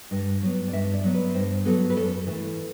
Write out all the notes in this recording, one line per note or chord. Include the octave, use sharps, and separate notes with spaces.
G2
F#3 B3
D5
G2 E5
D5
F#3 B3
B4
G2 C5
F#3 B3 A4
B4
F#2 A4
E3 A3